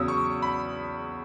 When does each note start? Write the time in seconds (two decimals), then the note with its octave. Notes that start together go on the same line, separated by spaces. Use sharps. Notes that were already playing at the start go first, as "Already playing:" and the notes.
Already playing: E2 C#3 F#3 D#6 E6
0.08 C#6
0.42 B5